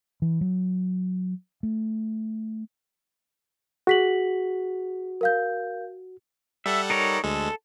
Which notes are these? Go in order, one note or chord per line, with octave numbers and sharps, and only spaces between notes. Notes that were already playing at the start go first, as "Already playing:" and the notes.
E3
F#3
A3
F#4 G#4 B6 F#7
A#4 F5 G6
G3 A4 E5 F#5
D#4 A#4 C#5
D2 G#3 A4